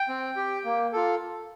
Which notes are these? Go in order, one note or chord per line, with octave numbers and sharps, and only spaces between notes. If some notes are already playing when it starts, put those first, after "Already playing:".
Already playing: G5
C4
G4
A#3
F4 A4